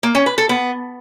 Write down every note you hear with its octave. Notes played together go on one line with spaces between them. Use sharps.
A#3
C#4
B4
A4
B3